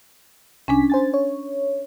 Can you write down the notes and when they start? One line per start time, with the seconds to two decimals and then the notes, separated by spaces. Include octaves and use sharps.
0.68 C2 C#4 D4 G#5 B6
0.90 C5 G#5 A6
1.14 C#5